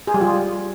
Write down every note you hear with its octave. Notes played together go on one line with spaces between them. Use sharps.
G#4
G3
F4